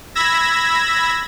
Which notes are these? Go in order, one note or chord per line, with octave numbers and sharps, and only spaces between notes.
B5 E6 G#6 A#6